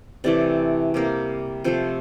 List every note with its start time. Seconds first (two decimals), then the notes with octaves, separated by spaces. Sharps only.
0.24 C3 E3 A3 D5
0.94 C3 G3 A#3
1.64 C3 F3 A3 C5